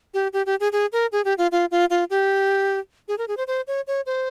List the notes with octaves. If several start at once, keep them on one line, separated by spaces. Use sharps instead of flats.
G4
G4
G4
G#4
G#4
A#4
G#4
G4
F4
F4
F4
F4
G4
G#4
A#4
G#4
C5
C5
C#5
C#5
C5